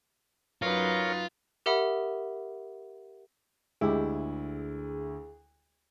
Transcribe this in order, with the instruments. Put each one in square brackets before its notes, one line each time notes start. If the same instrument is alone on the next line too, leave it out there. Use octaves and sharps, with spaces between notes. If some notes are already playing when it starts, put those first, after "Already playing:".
[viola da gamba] F#2 D#4 B4 [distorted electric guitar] F4 [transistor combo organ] A#4 C#5 F5
[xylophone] G4 A#4 E5 F#5 B5 D#6
[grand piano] D2 [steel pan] G#3 G4 [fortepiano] E4 [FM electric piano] G#4